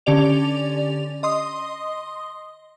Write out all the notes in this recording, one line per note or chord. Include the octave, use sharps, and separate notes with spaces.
D3 C#4 G4 D5 F7
D#5 C6 D#6